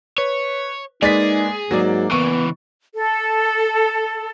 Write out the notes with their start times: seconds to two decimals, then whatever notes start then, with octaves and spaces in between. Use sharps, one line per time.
0.18 B4 C#5
1.02 G#3 A#3 D#4 G#4 B4 D5 A6 B6
1.71 G#2 F#3 A#3 D5
2.12 C#2 E3 B3 C#6
2.94 A4